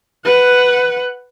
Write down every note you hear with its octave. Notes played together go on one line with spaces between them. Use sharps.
B4 F#5